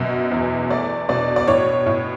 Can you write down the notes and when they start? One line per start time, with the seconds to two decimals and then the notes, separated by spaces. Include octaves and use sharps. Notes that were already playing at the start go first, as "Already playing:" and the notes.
Already playing: F#2 B2
0.32 E2
0.70 A3 D5
1.09 B2 D5
1.36 D5
1.48 A2 C#5
1.87 A2